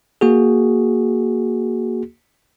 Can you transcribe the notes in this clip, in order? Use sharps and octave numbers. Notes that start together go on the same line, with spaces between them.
A#3 F#4 G#4